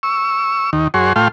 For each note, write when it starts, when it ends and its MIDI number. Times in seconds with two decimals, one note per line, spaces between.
0.03 0.70 85
0.03 0.70 88
0.73 0.88 39
0.73 0.88 51
0.94 1.13 42
0.94 1.13 66
0.94 1.13 68
0.94 1.13 73
0.94 1.13 84
1.16 1.28 45
1.16 1.28 57
1.16 1.28 65
1.16 1.28 77
1.16 1.28 79
1.16 1.28 84